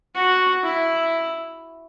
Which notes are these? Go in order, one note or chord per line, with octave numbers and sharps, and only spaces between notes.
F#4
E4